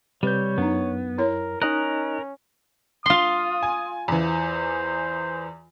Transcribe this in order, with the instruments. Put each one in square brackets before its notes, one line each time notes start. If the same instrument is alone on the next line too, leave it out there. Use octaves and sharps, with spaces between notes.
[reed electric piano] C3 G6 [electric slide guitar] G3 [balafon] B4 [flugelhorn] C#5
[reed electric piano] F#2 [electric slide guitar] B3 [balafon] D4 D#4
[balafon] E4 C#5 [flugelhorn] A#4
[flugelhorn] C#4 [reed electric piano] D#4 D#5 F#6 [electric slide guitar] A#4
[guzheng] F4 C6 [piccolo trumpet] D#6
[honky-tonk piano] G#5
[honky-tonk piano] E2 E3 [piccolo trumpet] C5